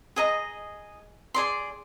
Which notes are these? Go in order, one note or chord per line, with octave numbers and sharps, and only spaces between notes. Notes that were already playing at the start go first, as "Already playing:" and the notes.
G#4 D#5 A#5
G#4 D5 C6